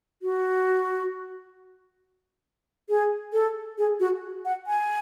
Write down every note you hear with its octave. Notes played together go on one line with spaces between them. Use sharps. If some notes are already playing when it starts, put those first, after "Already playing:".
F#4
G#4
A4
G#4
F#4
F#5
G#5